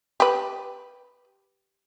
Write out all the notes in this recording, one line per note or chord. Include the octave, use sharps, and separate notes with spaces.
G4 B4